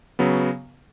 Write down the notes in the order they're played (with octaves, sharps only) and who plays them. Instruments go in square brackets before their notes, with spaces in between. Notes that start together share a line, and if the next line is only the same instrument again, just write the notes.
[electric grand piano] C#3 F#3 B3